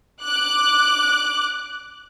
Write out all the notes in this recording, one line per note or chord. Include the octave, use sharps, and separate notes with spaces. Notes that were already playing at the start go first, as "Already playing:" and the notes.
D6 F#6